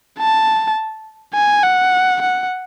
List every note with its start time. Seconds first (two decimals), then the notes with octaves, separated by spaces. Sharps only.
0.19 A5
1.34 G#5
1.64 F#5
2.22 F#5